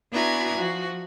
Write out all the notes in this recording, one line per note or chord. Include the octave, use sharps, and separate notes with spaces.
B3 D4 E4 F#4 G#5 A#5
F3 F#4